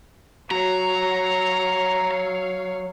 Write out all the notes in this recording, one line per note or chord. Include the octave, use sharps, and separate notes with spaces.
F#3 C#5 F5 A#5